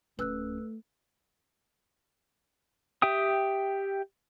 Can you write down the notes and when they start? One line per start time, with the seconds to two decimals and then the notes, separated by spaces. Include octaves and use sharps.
0.19 D1 A3 C#4 B4 E6 F#6
3.02 G4 E5 G5 D#6